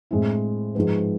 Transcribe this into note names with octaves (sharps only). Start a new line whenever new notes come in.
A2 G#3 C4 E4
G#2 F3 G#3 B3